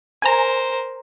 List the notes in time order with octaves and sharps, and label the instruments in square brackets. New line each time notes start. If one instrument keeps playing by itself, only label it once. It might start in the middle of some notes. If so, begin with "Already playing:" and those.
[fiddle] A#4 C5 [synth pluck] G#5 A#5